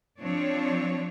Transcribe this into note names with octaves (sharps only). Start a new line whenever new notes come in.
F3 C4 D4 C#5